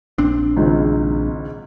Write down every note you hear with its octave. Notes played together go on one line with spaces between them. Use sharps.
A#1 C4 D4
G#1 C#2 G#2